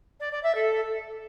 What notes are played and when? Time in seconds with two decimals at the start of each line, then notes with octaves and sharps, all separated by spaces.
0.20 D5
0.31 D5
0.43 E5
0.54 A4